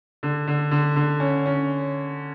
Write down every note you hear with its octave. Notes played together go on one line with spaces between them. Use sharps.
D3
D3
D3
D3
C#4
C#4